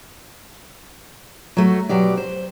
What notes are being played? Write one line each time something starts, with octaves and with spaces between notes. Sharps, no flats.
F#3 A3
B2 F#3 G4 D5
C5